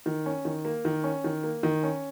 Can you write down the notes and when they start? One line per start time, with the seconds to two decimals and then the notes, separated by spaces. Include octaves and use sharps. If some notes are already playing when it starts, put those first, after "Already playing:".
0.06 D#3
0.26 C#4
0.45 D#3
0.65 A#3
0.85 D#3
1.04 C#4
1.24 D#3
1.43 A#3
1.63 D#3
1.83 C#4